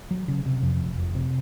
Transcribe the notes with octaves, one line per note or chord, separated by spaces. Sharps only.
F#3
C#3
C3
F2
F1
F1
C3